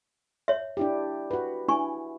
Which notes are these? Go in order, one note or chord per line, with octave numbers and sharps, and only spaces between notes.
C#5 E5
D4 E4 G4
F#4 B4
D4 E4 G#5 C#6